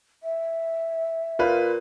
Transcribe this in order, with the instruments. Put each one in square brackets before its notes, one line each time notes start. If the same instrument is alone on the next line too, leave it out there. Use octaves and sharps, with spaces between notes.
[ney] E5
[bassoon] A#2 [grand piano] F4 B4